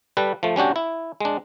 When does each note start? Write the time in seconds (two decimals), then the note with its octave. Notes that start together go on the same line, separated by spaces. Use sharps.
0.17 G3 A4 B4
0.43 F3 A3
0.56 G3 C#4 D4 F#4 G4
0.76 E4
1.21 G#3 D4